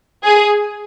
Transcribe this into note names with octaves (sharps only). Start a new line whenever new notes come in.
G#4